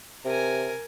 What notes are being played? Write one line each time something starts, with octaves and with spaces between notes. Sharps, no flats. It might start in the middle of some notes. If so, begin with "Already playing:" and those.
C3 A#4 G#5